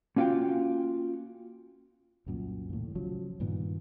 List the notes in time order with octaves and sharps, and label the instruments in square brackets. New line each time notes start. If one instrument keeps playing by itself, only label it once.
[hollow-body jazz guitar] A#3 C#4 F4 F#4 F5 G5
[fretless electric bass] C2 F#2 A#2
D#2 A2
C#3 F3 F#3
G2 A#2 D#3 B3